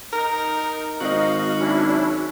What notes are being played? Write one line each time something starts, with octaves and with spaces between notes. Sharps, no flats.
D#4 A#4
G#1 C4 D#4 F#4 D#5 F5
F#3 C#4 D4 E4